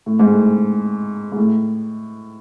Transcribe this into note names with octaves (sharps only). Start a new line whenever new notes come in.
A2
G#2
A2
G#2
A2